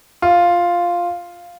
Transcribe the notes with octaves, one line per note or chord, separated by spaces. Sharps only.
F4